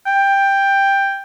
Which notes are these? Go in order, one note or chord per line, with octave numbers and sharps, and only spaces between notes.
G5